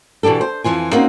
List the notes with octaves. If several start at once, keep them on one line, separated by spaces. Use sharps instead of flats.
B2 E3 D4 G4 A4
C5
F2 E3 F4 G#5
A#3 C4 C#4 D#4 F#4 A#4